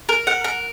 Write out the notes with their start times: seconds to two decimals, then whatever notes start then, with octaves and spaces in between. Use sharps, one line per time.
0.09 A#4
0.27 F#5
0.44 A#4